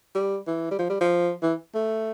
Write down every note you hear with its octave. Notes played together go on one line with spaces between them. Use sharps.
G3
E3
G3
F3
G3
F3
E3
A3